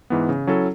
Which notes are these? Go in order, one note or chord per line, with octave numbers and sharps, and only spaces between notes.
G#2 E3 B3
C#3
F#3 C#4 E4 A4